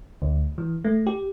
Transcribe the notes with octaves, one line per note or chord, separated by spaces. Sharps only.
D2
E3
A3
G4